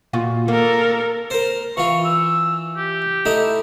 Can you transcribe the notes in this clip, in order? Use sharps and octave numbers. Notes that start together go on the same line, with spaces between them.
A#2 F4 F#4
A#3 A4 A#4
A#4 C5
E3 F4 C#6
E6
G4
A3 D#4 E4